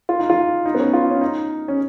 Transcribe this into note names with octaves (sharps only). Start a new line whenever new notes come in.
F4
D#4
F4
D#4
B3
C#4
F4
C#4
D#4
C#4